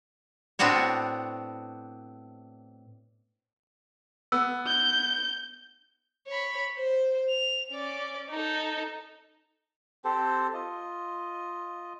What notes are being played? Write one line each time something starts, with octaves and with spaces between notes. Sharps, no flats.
A2 B3 C4 D4 F#4 C#5
B3 E6
G6
C#5 B5
C5
F7
C#4 D5
D#4 A4
C4 G4 A4 C5
F4 D#5